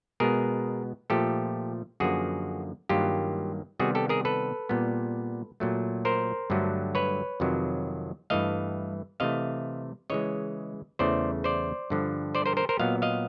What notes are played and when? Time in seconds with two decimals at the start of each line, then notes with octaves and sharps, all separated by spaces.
0.20 B2 G#3 B3 G#4 A#4
1.10 A#2 F3 A3 G4 A4
2.00 F#2 D3 F3 A#3 F#4 G#4
2.89 G2 D#3 F#3 A#3 F4 G4
3.79 C3 D#3 G3 B3 F#4 G#4
3.95 G4 A4
4.09 G#4 A#4
4.25 A4 B4
4.69 A#2 G3 B3
5.60 A#2 F#3 A3
6.05 A#4 C5
6.50 G2 D3 F#3 A3
6.95 B4 C#5
7.40 F2 C3 D#3 F#3
8.30 G2 E3 A3 D#5 F5
9.20 C3 E3 A3 D#5 F5
10.10 C#3 E3 G#3 C#5 D#5
10.99 E2 C#3 E3 A3 C5 D5
11.44 C5 D5
11.90 G2 D3 F3
12.35 C5 D5
12.46 A#4 C5
12.57 A#4 C5
12.69 A#4 C5
12.79 A#2 F#3 B3 D#5 F5
13.02 D#5 F5